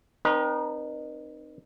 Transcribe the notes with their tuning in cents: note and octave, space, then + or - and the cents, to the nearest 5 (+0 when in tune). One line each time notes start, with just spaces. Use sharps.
C4 +0 D#4 -30 A#4 +45